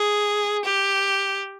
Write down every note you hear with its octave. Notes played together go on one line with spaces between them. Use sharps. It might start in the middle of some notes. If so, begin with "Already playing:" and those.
Already playing: G#4
G4